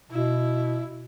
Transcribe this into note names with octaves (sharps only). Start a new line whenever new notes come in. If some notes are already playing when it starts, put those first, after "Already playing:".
B2 E4